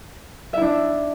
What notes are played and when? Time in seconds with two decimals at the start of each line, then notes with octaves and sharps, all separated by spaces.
0.53 E5
0.57 E4
0.62 D4